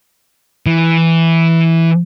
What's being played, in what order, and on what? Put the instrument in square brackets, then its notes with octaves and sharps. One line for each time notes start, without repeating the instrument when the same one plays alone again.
[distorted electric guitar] E3